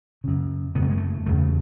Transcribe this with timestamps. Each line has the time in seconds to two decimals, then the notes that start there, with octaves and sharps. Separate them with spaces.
0.24 F#2 C#3
0.75 C#3 B3
0.79 F#2 A3
0.90 G#3
0.97 A3
1.26 E2 C#3 A3